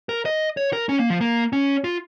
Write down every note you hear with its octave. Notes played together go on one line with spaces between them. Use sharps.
A#4
D#5
C#5
A#4
C#4
A#3
F3
A#3
C#4
F4